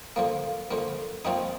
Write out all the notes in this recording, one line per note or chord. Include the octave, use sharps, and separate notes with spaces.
D3 F3 A#3
D3 F3 A#3
A#2 F3 C4 D#4